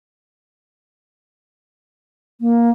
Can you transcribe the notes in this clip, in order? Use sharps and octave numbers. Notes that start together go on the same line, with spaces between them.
A#3